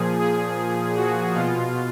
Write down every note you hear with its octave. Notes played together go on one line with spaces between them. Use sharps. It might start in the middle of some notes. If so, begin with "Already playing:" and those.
Already playing: A#2 F3 G#4
G#4
F#4
B2 F4